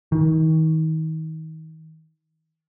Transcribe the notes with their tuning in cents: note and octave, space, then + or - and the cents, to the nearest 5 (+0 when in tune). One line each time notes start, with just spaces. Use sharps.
D#3 +35